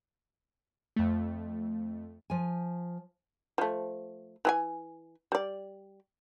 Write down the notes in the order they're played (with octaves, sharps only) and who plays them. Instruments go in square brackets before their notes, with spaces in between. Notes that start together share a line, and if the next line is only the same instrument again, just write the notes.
[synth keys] F2 A3
[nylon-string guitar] F3 G#5
[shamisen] F3 A3
E3 G#4 G#5
G3 D5